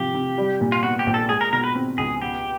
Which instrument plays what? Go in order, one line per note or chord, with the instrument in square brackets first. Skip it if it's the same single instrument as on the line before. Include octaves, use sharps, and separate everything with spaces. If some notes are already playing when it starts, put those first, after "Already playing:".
Already playing: [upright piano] C3 F3 [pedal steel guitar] G4
[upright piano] C3
G3
A#2
[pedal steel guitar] F4
[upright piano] B3 [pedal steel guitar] F#4
[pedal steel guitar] G4
[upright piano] A#1
[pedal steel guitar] A4
[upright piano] G#3 [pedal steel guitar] G#4
[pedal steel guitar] A#4
[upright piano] B2 [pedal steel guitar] A#4
[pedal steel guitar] B4
[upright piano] C4
[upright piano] C#2 [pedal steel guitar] G#4
[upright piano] B3 [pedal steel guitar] G4